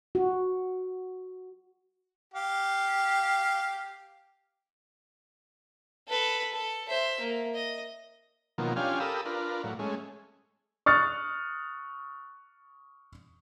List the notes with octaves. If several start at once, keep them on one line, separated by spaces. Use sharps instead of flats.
F#4
G4 F5
A4 B4
A4
C5 E5
A#3
D#5
B2 D#3 F3 F#3 A#3
C#4 D4 F4 G4 F5 G#5
G4 A4 A#4 B5 D#6 E6
D4 F4 A#4 B4
A2 F#3
G#3 A3 C#4
C#6 D#6 F6 F#6 A6 C#7